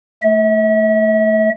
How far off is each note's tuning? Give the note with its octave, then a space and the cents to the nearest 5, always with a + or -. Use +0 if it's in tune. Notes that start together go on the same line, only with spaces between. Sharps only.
A3 +0 E5 -40